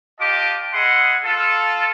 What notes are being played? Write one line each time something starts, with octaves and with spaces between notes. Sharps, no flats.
F4 G4 D#5 A5 D6
E4 G#4 D#5 F#5 C6
F4 A4